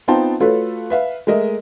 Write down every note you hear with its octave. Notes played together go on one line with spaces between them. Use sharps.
B3 C4 D#4 F4 G5 A5
A3 F4 F#4 A4 B4 C#5
B4 E5 F5
G#3 A3 A#4 D#5 E5